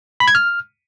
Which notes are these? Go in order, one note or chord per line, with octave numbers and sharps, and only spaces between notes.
B5
G#6
F6